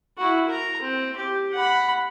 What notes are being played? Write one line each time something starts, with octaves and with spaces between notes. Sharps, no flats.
E4 F#4
A#4 A#5
C4
G4
F#5 B5